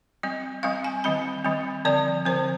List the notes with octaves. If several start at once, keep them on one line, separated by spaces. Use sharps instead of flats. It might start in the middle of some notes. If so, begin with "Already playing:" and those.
G3 C4 D#5
G3 C4 F5
G#5
D#3 G3 C4 B5
D#3 G3 C4
D3 F3 C4 D5
D3 F3 C4 C5